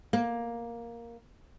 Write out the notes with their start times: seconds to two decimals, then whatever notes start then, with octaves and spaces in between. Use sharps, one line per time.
0.13 A#3